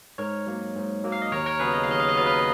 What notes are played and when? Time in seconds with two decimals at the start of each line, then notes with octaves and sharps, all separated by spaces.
0.18 G#2 A#4 C#5
0.46 F#3 A#3
0.76 G#2
1.04 F#3 A#3
1.12 F5
1.22 D#5
1.32 D#2 A#4 C#5
1.46 A#4 C#5
1.59 C#3 F#3 B3 G#4 B4
1.74 D#5
1.83 F5
1.88 D#2 D#5
2.00 F5
2.09 D#5
2.16 C#3 F#3 B3 F5
2.26 B4 D#5